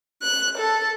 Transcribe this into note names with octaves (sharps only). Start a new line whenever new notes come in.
F#6
A4